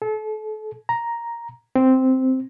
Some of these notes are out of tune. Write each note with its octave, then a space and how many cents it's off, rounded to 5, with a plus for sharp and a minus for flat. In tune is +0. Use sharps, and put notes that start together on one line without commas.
A4 -35
A#5 +5
C4 -5